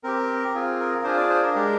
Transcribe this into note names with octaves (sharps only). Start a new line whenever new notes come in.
C4 G4 A#4
C4 F4 G#4
A#4
D4 F4 G#4 C5
D5
C5
A#4
G#3 D4 G4